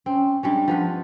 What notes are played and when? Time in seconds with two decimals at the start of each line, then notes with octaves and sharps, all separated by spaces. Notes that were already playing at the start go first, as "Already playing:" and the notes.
0.06 C4 C#4
0.43 G3 G#3 C#4 D4
0.68 F3 B3 B4